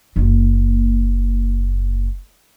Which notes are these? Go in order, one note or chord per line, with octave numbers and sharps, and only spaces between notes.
F#1 A#3